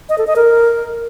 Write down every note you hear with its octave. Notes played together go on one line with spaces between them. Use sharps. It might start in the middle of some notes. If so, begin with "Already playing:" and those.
D#5
A4
D#5
A#4